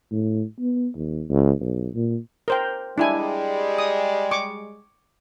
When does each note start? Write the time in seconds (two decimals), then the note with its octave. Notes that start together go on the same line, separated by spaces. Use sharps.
0.12 A2
0.60 B3
0.96 D#2
1.29 C#2
1.60 B1
1.95 A#2
2.48 A#4 C5 G5
2.98 G3 G#3 D4 E4 G#5
3.78 D#6
4.31 C#6 D6